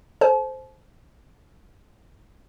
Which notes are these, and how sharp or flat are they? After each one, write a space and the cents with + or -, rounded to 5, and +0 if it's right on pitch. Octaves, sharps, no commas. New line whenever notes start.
A4 -25 C5 +0 A5 -40